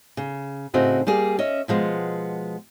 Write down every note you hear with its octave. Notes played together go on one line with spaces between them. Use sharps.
C#3
A2 C#3 C4 D#4 E4 F#4
G3 A#3 G#4
C#4 D#5 E5
B2 F3 G#3 B3